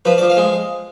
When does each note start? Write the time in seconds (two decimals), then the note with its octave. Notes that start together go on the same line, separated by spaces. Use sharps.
0.05 F3 B4
0.18 D5
0.21 F3
0.30 F5
0.37 G#3